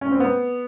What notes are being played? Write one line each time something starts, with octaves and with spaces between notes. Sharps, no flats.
C#4
C4
B3